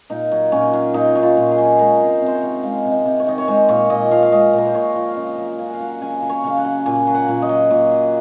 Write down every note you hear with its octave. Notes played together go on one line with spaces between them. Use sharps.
A#2 D#4
F#3
A#2 C#4
F#3
A#2 D#4
F#3 D#4
F4
A#2
G#4
F#3
G#3 A#4
C3
C5
C3
C5
C#5
D#3
G#3 F5
C3
D#5
C3
C#5
D#3 D#5
C#5
G#3 C5
A#2 C#5
A#2 D#5
F3 F5
F5
G#3 D#5
A#2 A#4
C5
A#2 C#5
F3
C#3 D#5 F5
F#3
C#3 G#5
F#5
F5
F#3 F#5
C#3 G#5
F#3
C#5
C#3 F5
F#5
F#3
A#2 G#5
F#3
F#5
A#2
D#5
F#3
A#2
F#3